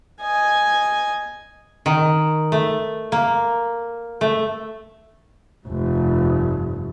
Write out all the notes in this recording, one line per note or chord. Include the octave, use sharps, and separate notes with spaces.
D#5 G#5
D#3
A3
A#3
A3
F1 G2